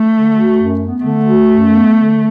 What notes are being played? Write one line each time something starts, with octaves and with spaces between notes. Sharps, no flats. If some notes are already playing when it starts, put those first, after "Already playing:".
Already playing: A3
D3
F#4
F#2
B3
D3 A3
F#4
F#2
B3
D3